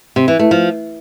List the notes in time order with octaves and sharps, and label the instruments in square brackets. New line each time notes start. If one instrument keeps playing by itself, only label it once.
[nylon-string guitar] C3
E3
A3
F3